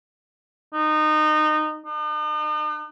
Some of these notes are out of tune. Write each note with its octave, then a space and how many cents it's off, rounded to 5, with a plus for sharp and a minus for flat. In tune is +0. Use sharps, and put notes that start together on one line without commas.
D#4 -20
D#4 -45